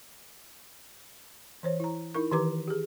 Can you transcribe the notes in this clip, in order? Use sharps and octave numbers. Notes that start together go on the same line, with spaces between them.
E3 C5 C#5
E4 A#5
D#4 E4 A#4 C#6
D#3 E3 G4 B4 A#5 D6
G4 G#4